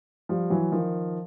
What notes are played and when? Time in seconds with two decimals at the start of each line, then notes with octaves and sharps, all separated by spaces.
0.29 F3 G3
0.50 E3 F#3
0.71 D#3 F3